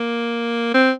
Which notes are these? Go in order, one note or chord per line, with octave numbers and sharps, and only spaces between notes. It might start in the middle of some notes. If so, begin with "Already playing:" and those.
Already playing: A#3
C4